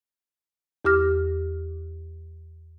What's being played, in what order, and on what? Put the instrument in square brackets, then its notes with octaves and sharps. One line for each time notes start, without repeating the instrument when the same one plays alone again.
[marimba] E2 G4 D6 F6 A#6